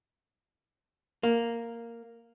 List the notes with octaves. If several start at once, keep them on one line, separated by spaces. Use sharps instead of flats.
A#3